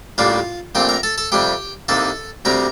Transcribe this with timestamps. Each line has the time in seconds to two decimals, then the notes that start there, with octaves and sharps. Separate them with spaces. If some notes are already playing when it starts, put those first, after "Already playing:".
0.18 A1 A2 G3 A#3 D4 F4 F5
0.75 A#1 A#2 A3 C4 G4 G5
0.89 A#4 A#5
1.03 A4 A5
1.18 A4 A5
1.32 F2 C3 G3 G4 G5
1.88 C2 C3 D#3 A#3 A4 A5
2.45 D2 C3 G3 C4 A#4 A#5